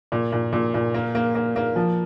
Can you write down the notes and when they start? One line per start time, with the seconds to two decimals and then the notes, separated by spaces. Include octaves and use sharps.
0.12 A#2
0.32 A#2
0.52 A#2
0.74 A#2
0.94 A#3
1.15 A#3
1.35 A#3
1.56 A#3
1.76 F3